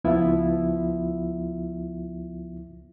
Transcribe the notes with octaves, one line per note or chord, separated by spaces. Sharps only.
C#2 F3 B3 E4 F4 E5